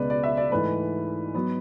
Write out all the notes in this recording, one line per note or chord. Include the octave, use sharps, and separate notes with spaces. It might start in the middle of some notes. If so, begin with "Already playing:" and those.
Already playing: C#2 B2 G#3 B3 B4 D5
D5
E5
D5
G#2 E3 A3 B4
F#3 B3